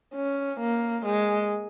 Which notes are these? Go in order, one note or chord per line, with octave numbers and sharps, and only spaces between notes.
C#4
A#3
G#3